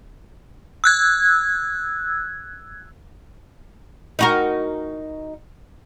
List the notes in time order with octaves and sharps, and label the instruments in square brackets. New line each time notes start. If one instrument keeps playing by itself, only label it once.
[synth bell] E6 F#6 G#6
[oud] D#4 F#4 A#4